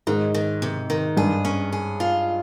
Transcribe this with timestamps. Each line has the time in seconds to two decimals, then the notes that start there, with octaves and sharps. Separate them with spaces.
0.07 G#2 D#3
0.34 D#3
0.62 C3
0.90 D#3
1.17 G2 G#4
1.45 C#4
1.72 G#4
2.00 F4